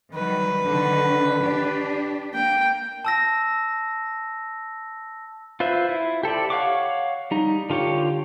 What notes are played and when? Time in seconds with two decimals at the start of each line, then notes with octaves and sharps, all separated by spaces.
0.14 D#3 F#3 G3 B4
0.67 D3 D#3
1.41 D4 G4
2.34 A#3 G5
3.05 A5 E6 A#6
5.60 F4 B4 C5 E5
5.89 E4
6.23 G4 A4 C5 D5
6.50 C#5 F5 F#5 C#6 D6
7.31 G3 D#4
7.70 D3 F4 G4 C#5